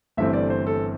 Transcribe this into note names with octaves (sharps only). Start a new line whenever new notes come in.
G1 G2 E3 A3 C4 E5
D5
C5
A4